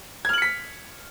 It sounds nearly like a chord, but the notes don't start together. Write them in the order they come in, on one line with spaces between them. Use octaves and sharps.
G#6 F6 F#7 C#7 B6